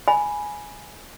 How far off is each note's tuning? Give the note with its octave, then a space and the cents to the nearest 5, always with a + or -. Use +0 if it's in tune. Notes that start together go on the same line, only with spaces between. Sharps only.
G#5 +0 B5 -10